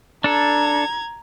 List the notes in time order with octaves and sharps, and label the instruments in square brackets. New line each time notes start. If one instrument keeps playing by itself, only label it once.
[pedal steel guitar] D4 A4 [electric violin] A#5 G#6